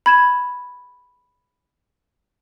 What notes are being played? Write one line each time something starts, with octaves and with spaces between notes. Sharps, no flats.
B5 G#6 E7